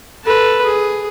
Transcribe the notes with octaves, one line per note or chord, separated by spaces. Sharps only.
A4 B4
G#4